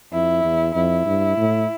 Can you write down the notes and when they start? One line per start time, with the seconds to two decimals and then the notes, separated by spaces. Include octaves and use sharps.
0.12 F2 E4
0.44 E2
0.75 F2 E4
1.06 G2
1.38 A2